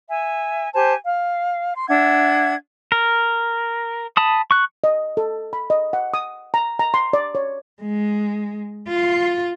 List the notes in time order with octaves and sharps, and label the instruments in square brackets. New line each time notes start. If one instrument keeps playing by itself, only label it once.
[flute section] E5 G#5
G4 C5 G#5 A5
F5
C6
D4 E5 F#5 G#6
[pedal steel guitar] A#4
A5 B5 D#6
C#6 F#6
[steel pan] D#5
A4
B5
D#5
F#5
D#6
A#5
A#5
C6
D5
C#5
[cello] G#3
F4